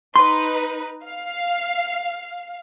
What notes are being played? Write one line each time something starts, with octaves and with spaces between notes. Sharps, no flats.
D#4 B4 C6
F5